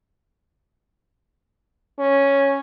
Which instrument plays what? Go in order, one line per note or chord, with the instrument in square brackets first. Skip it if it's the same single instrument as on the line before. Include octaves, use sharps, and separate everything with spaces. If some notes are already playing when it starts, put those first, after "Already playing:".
[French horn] C#4